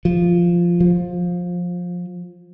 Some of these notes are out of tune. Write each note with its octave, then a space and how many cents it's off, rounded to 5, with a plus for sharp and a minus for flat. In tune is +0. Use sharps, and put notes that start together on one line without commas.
F3 -10
F3 +20